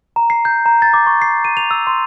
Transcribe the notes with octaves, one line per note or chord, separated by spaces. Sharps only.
A#5
C7
G6
A#5
A6
D6
C#6
C7
D#7
F7
E6
C6